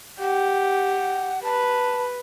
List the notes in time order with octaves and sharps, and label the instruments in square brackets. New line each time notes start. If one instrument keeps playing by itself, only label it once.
[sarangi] G4 [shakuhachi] F#5
[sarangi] B4 [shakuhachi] A5